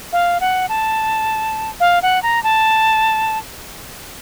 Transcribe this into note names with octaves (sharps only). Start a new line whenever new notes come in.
F5
F#5
A5
F5
F#5
A#5
A5